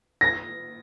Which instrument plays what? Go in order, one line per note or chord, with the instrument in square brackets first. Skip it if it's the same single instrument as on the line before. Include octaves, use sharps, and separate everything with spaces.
[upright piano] A#6